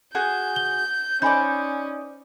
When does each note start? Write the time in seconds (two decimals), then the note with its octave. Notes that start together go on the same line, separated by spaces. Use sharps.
0.15 F#4 G#4 G#5 G6
0.56 G7
1.22 C#4 D#4 C5 D5 G#5 B5 G6